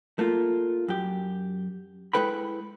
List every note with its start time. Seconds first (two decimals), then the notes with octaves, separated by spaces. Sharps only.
0.19 A3 A#3 F4
0.88 F#2 G4
2.13 G#3 E4 A4 B4 G5 B5